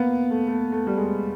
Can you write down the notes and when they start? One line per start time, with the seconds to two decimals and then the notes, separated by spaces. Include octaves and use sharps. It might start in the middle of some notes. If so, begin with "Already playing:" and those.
Already playing: A#3 B3
0.30 A3
0.48 A3
0.72 A3
0.87 G3
0.97 G#3